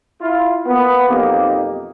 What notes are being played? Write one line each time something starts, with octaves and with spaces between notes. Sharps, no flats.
E4 F4
A#3 B3
B1 F2 A#3 D#4 G4